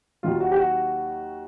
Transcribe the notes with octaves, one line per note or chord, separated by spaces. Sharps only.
D#2 D#3 F#3 F4
F#4
G4
F#4